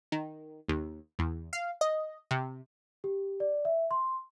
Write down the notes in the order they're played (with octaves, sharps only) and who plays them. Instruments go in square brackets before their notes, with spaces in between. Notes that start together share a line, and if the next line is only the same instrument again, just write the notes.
[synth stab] D#3
D#2
E2
F5
D#5
C3
[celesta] G4
D5
E5
C6